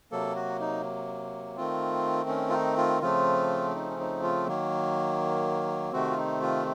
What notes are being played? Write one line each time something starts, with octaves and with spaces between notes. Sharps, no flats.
C3 F#3 A#3 A4
F#4
D#4
D#3 A3 C4 F4
C#4
F4
D#4
F4
C#3 F3 A3 C4 F4
D#4
C#4
D#4
F4
D#3 F#3 A#3
C3 D#3 A3 C4 F#4
F4
D#4
F4